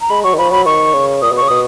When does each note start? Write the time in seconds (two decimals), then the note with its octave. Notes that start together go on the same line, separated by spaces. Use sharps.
0.01 A#5
0.10 G#3 B5
0.24 F#3 C#6
0.33 D#3
0.38 F3 B5
0.52 F#3 B5
0.66 D#3 C#6
0.94 C#3
1.22 A#2 D#6
1.31 B2
1.37 C#3 C#6
1.48 B2 D#6